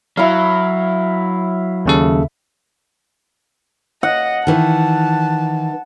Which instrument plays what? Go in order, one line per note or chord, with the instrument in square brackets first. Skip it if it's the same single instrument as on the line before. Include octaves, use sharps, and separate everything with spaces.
[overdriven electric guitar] F#3 [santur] E4 F5
[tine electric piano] D#2 C#3 A4
[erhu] D#5 [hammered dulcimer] F#5
[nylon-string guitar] D#3 E3 [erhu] A5